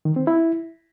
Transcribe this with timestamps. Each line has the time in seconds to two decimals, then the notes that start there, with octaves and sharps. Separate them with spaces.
0.05 D#3
0.16 C4
0.27 E4